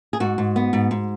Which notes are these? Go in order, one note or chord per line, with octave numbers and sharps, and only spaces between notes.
G#4
G#2 F#4
G#2
B3
G#2
G#2